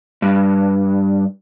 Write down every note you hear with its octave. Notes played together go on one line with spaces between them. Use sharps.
G2